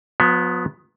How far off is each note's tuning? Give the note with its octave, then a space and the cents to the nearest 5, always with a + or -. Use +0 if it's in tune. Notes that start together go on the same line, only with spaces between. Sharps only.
F3 +45 B3 +0